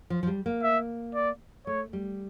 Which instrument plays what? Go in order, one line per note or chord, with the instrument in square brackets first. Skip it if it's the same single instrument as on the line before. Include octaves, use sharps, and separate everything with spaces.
[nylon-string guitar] F3
F3
G3
A#3
[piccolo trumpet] E5
D5
[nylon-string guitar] A3 [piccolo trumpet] C#5
[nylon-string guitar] G3